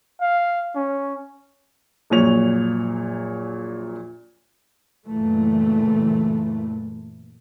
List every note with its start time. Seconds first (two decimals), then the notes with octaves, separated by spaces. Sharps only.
0.21 F5
0.76 C#4
2.10 A#1 F#2 A#2 C#5 F7
5.07 F#1 A#2 E3 A3